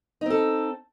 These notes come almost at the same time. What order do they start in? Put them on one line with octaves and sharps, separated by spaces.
D#4 C4 A4